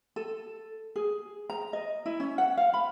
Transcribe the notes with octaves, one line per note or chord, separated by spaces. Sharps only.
A4
G#4
A#5
D#5
E4
C#4
F#5
F5
B5